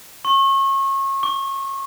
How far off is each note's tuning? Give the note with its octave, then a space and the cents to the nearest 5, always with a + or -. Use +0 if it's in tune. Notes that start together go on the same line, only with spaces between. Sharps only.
C#6 -30
C#6 +40